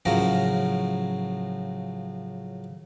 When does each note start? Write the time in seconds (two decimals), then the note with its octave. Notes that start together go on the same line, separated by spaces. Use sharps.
0.05 A2 C#3 F3 F#3 A#4 A#5